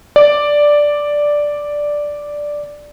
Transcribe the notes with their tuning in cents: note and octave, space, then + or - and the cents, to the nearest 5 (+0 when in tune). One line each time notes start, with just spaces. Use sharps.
D5 +0